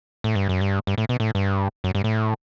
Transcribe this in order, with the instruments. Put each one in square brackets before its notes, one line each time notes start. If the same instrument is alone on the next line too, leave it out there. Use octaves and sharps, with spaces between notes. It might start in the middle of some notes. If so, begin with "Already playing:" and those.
[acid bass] A2
G2
F#2
G2
G2
A2
B2
A2
G2
F#2
G2
A2